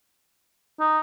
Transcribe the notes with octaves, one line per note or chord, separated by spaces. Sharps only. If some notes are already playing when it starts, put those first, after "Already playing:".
D#4